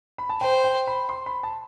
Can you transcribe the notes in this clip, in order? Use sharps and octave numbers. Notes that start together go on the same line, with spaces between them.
B5
A5
C5 G5
G5
B5
C6
B5
A5